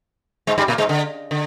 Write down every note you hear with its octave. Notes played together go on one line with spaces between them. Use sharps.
G#2 G#3
G2 G3
A#2 A#3
G#2 G#3
D3
D3